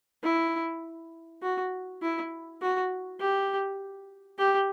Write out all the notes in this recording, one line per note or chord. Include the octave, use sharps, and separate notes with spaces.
E4
F#4
E4
F#4
G4
G4